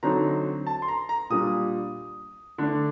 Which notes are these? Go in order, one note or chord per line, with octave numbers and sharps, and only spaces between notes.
D3 F#3 C4 D#4 A#5
A5
C6
A#5
A#5
A#2 G3 D4 D#6
D3 A3 D4